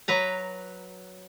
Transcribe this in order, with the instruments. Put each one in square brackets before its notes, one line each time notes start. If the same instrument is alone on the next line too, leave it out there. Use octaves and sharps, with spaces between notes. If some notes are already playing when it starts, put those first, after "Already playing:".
[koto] F#3 B4 A#5